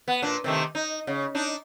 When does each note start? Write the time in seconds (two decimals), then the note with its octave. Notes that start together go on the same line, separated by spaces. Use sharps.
0.08 B3
0.22 A#2 D4
0.44 C3 D#3 A3
0.75 D#4
1.07 C#3
1.35 D4 D#4